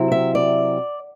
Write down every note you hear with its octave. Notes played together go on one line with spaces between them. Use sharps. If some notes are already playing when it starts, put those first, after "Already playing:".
Already playing: C3 F#3 C4 E4
E5
D5